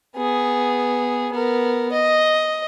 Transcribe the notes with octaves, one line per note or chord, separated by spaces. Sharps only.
B3 G#4
B3 A#4
D#5